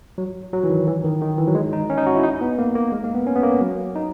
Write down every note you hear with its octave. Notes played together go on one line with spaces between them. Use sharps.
F#3
F#3
E3
D#3
E3
D#3
D#3
E3
F#3
G#3
D#4
C#4
D#4
F#4
E4
D#4
B3
A#3
A#3
G#3
A#3
B3
C#4
B3
A#3
F#3
D#4